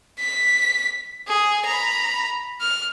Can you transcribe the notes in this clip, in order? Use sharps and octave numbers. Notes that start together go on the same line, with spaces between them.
B6
G#4
A#5 B5
F6